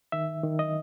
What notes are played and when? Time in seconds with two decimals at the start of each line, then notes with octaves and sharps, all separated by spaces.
0.12 D#3 E5
0.43 D#3
0.59 D#5